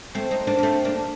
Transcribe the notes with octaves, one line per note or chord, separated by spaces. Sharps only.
A3 C4
C4 D#4
A#3 D4
A#3
A3 C4
A#3 D4